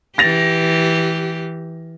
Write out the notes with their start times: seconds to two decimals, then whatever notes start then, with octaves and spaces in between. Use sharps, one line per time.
0.18 E3 G4 A6 A#6 F7